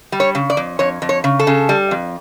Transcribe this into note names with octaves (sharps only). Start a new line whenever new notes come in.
G3
C#5
C#3
D5
F2
F2 C#5
F2
C#5
C#3
A4
C#3
G3
F2